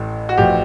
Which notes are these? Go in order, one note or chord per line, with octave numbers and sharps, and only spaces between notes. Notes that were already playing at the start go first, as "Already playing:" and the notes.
Already playing: A1 A2
F#4
A1 A2 F3 G4